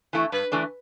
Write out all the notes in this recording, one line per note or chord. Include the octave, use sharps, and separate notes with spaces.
E3 A3 E4
G2 B4
E3 A3 D4